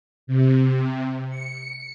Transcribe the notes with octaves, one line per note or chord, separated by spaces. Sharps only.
C3
C#7